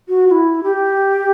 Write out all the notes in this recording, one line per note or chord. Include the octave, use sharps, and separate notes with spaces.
F#4
F#4
E4
G4